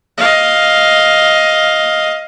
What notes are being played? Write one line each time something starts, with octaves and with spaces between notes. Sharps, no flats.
D#5 F5